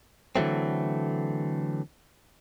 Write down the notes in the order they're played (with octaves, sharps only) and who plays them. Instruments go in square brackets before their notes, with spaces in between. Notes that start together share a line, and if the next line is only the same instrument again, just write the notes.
[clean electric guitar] D3 E3 F#3 A3 C4